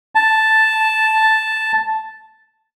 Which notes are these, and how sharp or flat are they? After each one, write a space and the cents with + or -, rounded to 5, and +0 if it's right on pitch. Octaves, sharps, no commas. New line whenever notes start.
A5 +0